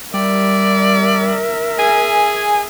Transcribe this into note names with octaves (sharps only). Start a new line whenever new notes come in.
G3 A#4 D5 E5
G#4 G#5